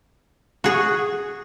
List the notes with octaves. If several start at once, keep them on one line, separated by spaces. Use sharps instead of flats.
F#4 G#4